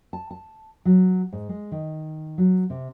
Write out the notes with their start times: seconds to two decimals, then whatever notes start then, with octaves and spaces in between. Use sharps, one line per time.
0.13 A5
0.31 A5
0.85 F#3
1.32 G#2
1.49 G#3
1.72 D#3
2.38 F#3
2.70 C3